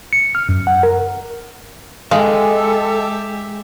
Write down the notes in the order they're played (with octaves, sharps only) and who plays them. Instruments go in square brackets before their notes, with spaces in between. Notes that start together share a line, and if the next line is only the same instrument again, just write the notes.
[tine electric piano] C#7
F6
F#2
F#5
A#4
[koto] G#3 [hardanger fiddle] G4 E5 [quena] A4 [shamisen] F5